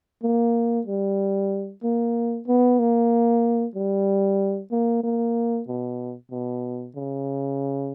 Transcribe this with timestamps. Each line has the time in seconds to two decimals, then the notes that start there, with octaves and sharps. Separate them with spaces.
0.23 A#3
0.87 G3
1.83 A#3
2.48 B3
2.79 A#3
3.75 G3
4.72 A#3
5.04 A#3
5.68 B2
6.32 B2
6.96 C#3